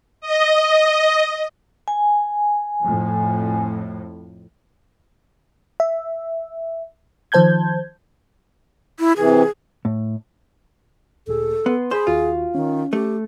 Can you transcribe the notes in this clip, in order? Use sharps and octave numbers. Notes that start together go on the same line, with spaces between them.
D#5
G#5
F2 A2
E5
D#3 F3 C5 A5 G6 G#6
E4
C3 E3 G#4
A2
D2 A#2 G#4 A4
B3 C6
G#4 C5 G#5 B5
D#2 F4 F#4
D#3 C#4
A3 G4